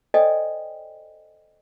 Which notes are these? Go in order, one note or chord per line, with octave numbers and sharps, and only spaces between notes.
A4 C5 D5 D#5 G5 G#5